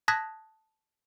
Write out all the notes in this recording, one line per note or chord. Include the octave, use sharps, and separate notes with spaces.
A5 D#6 F#6 G#6 A#6 B6